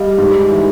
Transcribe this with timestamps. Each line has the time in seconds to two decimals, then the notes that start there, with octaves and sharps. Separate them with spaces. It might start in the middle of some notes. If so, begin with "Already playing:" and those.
Already playing: G3 D#5 F5
0.18 G#2
0.50 E3